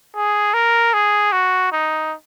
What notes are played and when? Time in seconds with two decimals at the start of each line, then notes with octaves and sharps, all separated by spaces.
0.15 G#4
0.54 A#4
0.94 G#4
1.32 F#4
1.72 D#4